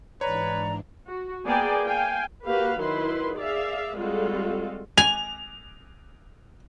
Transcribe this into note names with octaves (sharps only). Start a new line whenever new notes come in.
G#2 E3 D4 B4 C#5 D5 A#5
F#4
A#3 B3 G#4 D5 G5 G#5
F5 G5 G#5
A#3 F#4 G4 B4 F5
D#3 F#3 E4 B4 C6
G#4 D5 E5 F5
G3 G#3 C4 F4 F#4 A4
G#5 F7